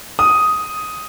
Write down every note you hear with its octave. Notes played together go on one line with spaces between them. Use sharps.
D#6